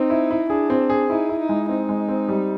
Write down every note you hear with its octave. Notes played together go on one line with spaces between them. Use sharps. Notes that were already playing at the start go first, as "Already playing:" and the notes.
Already playing: C4 D#4
E4
E4
D4 G#4
C4
G#4
D#4 E4
E4
D#4
G#3
C4 D#4
G#3
C4
G3